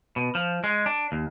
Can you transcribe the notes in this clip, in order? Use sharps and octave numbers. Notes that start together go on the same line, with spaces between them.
B2
F3
G#3
D4
D#2